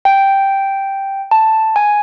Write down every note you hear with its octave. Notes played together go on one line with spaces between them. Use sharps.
G5
A5
G#5